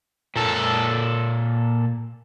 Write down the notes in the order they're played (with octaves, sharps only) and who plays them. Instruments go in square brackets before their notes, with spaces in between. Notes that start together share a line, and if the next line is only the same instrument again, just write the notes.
[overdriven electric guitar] A#2 A4